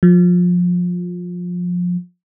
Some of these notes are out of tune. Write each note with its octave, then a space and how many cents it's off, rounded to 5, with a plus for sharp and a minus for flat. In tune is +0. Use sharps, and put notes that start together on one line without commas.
F3 +25